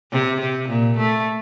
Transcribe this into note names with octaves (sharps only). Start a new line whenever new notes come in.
C3
C3
A#2
A3